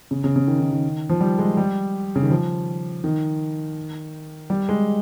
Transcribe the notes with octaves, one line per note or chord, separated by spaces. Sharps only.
C#3
C#3
C#3
D#3
D#3
D#3
F3
G3
G#3
G3
C#3
D#3
F3
D#3
G3
G#3